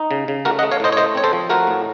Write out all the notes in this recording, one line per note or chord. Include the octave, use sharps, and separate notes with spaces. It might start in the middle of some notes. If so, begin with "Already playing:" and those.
Already playing: D#4
C#3
C#3
A3 F#4 A#4
D#5 F#5
A3
C#5 F5
A2 C5 D#5
C#5
A3 C5 D#5
C4 C#5
A4 C5
F3
A3 F#4 A#4
A2